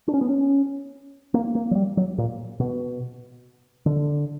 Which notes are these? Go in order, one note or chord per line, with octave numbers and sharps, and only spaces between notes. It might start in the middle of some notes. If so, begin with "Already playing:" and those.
D4
C#4
B3
C#4
A#3
A#3
F#3
G3
F#3
A#2
B2
D3